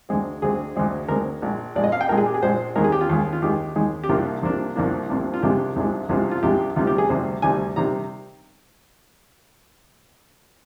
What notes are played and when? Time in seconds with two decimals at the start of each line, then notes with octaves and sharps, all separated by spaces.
0.09 D2 D3 G#3 C4
0.42 D2 D3 G#3 C4 G#4
0.76 D2 D3 G#3 C4
1.08 D2 D3 G#3 C4 A#4
1.42 A#1 A#2 G#3
1.76 A#1 A#2 G#3 D5
1.84 D#5
1.92 F5
2.01 G5
2.09 A#1 A#2 G#3 A#4
2.17 G#4
2.26 G4
2.34 G#4
2.42 A#1 A#2 G#3 C5
2.76 D#2 D#3 G#3 A#4
2.84 G#4
2.92 G4
3.01 F4
3.09 D#2 D#3 G#3
3.33 F4
3.42 D#2 D#3 G#3 G4
3.76 D#2 D#3 G#3
4.04 G4
4.09 C2 C3 F3 A#3 D4 F4
4.42 C2 C3 F3 A#3 D4
4.76 C2 C3 F3 A#3 D4
5.09 C2 C3 F3 A#3 D4
5.34 F4
5.43 C2 C3 F3 G#3 D4 G4
5.76 C2 C3 F3 G#3 D4
6.09 C2 C3 F3 G#3 D4
6.31 F4
6.43 C2 C3 F3 G#3 D4 G4
6.76 D2 C3 D#3 G3 F4
6.87 G4
6.98 G#4
7.09 D2 C3 D#3 G3 C5
7.42 D2 C3 D#3 G3 G#5
7.76 C3 D#3 G3 A#5